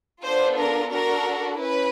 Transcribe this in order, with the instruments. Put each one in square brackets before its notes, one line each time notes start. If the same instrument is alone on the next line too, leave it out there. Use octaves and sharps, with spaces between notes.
[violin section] B3 D4 F4 A4 C5
A#4
D4 F#4 A4 A#4
C#4 E4 B4